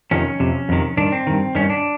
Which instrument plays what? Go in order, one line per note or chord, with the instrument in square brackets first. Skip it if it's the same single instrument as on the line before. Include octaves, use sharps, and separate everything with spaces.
[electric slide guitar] F2 C3 D#3 C#4
F2 C3
F2 C3 D#3
G2 D#3 D4
C4
G2 D#3
G2 D#3 C#4
D4